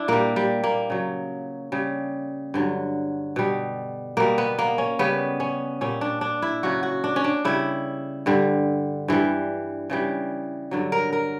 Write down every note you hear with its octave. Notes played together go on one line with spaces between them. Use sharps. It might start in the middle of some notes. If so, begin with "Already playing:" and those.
Already playing: D4 E4
A#2 G3 A#3
G3
A#3
C#3 F#3
C#3 G3
G2 D3 F#3
B2 G3
B2 G3 A#3
B3
A#3
C#4
C#3 G3 B3
C#4
A#2 G3 C#4
D4
D4
E4
C#3 F#3 F#4
F#4
D4
C#4
D4
C#3 G3 E4
G2 D3 G3
G2 E3 G3
C#3 E3 G3
G2 D3 F#3
A#4
A#4